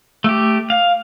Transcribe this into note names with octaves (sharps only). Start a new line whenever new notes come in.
A3 G4
F5